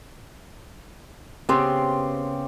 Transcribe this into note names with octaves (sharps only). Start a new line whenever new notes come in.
C#3 B3 C4 G4 C6